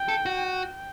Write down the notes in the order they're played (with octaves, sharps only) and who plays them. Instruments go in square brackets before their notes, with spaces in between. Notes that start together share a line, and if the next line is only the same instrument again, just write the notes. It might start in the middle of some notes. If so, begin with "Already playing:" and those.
Already playing: [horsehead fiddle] G5
[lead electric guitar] A4
F#4
[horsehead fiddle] G5